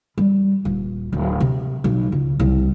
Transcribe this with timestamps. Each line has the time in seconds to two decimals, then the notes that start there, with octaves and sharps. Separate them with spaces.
0.18 G3
0.65 D#1
1.13 D1
1.40 C3
1.84 B1
2.12 C#2
2.40 C2